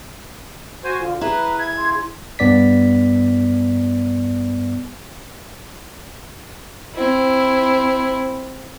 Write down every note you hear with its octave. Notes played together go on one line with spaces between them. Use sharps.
F#4 C5 G#5
D3 F4
E4 G#4 B4 A#5
E5 G#6
C#3 C6
G2 B3 D5 B6
C4 E4